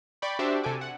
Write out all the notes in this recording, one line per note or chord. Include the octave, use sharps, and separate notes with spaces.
D5 G5 B5 C#6
D4 F#4 G4 C5 D5 E5
C3 A4 G#5 D6
F#5